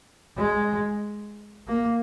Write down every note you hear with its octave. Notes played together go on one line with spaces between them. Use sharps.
G#3
A#3